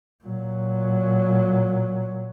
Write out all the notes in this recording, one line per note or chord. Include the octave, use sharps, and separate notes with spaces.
A#2 F#3